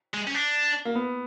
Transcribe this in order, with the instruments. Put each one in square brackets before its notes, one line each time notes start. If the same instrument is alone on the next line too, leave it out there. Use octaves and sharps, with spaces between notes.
[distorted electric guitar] G#3
C#4
D4
[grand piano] A#3
B3